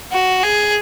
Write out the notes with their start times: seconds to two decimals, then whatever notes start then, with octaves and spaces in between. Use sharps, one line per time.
0.12 F#4
0.44 G#4